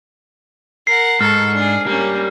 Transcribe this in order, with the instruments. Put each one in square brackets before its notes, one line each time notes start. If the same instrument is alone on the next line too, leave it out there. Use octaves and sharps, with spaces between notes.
[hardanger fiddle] A#4 F#5 [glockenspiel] C7
[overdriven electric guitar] G#2 [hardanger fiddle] A4 C#6 [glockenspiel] F6
[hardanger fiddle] D4 G#4
[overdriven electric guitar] G3 [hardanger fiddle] A#3 C#4